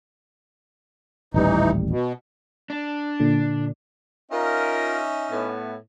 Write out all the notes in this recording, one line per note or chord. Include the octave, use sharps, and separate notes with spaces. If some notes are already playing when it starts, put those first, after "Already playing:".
D#1 A1 E3 G3 D#4
B2
D4
A#2 D3
C#4 D#4 F4 A#4 E5
A2 B3